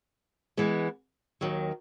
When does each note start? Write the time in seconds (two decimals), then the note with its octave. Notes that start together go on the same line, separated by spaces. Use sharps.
0.57 E3 G#3 B3
1.41 D#2 D#3 F#3